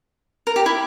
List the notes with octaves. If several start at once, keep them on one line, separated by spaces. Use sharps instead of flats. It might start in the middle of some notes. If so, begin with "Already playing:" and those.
A#4
G4
E4